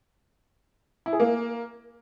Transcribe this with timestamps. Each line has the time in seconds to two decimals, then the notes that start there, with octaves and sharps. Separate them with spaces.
1.06 E4
1.13 G#4
1.20 A#3